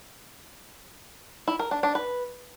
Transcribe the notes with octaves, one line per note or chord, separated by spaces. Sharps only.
E4
A#4
D4
D4
B4